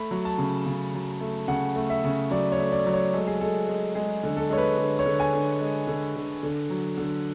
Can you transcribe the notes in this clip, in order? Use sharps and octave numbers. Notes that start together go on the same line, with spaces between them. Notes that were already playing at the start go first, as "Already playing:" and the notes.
Already playing: A3 B5
F#3
A5
C#3
C#3
F#3
A3
C#3 F#5
A3
E5
C#3
F#3 D5
C#5
A3
D5
F#3
C#5
G#3 A4
G#4
G#3 A4
G#3
G#3 G#4
D3
A4
G#3 C#5
B4
D3
C#5
D3
G#5
D3
G#3
D3
D3
D3
F#3
D3